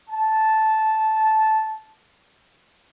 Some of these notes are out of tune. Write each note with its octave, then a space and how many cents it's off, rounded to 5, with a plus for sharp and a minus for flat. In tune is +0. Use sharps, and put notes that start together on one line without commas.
A5 -10